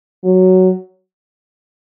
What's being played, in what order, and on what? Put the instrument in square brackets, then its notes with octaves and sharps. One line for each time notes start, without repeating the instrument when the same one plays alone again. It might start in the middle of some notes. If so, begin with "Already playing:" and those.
[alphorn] F#3